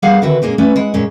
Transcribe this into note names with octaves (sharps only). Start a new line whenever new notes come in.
G3 A#3 B3 G#4 F5 F#5
D3 D#3 C4 F#4 B4 E5
A#2 G#3 A#3 C#4
A3 C#4 B4 D5
G#3 E4 F#5
A#2 G#3 C#4